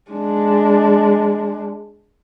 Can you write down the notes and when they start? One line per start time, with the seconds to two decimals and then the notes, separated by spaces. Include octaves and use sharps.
0.11 G#3 D4